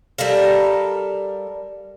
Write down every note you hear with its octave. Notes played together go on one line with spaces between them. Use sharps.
G3 A4 A#4 F5